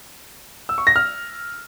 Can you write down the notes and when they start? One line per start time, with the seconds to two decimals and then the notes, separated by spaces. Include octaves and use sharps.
0.69 E6
0.78 C#6
0.87 A#6
0.96 F6